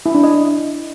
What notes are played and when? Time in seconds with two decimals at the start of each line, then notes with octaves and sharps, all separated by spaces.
0.06 E4
0.15 D4
0.24 D#5